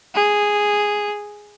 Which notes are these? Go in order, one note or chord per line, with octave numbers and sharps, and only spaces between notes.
G#4